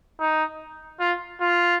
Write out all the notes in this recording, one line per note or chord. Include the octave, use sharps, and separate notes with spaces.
D#4
F4
F4